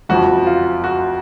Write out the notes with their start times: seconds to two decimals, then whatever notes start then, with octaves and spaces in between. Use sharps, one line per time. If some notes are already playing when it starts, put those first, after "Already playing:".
0.09 F#1 F2 F3 F#4
0.47 F4
0.84 F#4